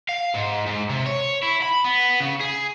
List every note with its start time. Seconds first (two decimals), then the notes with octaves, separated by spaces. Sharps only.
0.09 F5
0.34 G#2
0.66 G#2
0.90 C3
1.06 C#5
1.42 E4
1.62 B5
1.84 B3
2.20 C#3
2.41 G#4